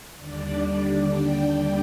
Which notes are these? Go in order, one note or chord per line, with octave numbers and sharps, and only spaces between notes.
D#2 D3 G3 D4 D5
G5